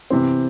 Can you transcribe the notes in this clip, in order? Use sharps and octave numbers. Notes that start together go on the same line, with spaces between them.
C3 E3 C4